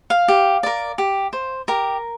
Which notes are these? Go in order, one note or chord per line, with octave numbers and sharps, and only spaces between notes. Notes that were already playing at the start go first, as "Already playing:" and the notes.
F5
G4
A#4 D5
G4
C5
G4 A#4 A#5